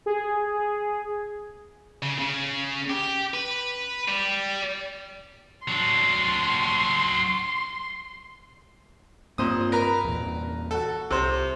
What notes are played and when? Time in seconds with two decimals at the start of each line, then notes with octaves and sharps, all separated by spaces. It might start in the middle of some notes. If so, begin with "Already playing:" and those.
0.06 G#4
2.02 C#3
2.18 C#3
2.89 G4
3.34 B4
4.08 G3
5.68 F#3 D4 C6
9.38 G2 A#2 A#3 C4 C5 D#6
9.72 A#4 B4 A#5
10.04 E2 A#2
10.71 F#4 A4
11.11 C2 C3 C5